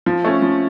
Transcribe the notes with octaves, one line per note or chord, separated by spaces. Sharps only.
F3
A3 C#4
F3